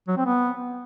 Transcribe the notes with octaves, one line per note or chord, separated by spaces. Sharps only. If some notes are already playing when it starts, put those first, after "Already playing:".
F#3
C4
B3